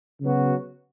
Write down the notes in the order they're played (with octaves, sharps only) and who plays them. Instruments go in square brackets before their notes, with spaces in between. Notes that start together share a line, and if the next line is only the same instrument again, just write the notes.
[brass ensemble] C#3 F#3 B3 F#4